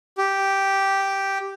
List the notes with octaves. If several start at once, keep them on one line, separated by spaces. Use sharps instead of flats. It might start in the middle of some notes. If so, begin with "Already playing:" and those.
G4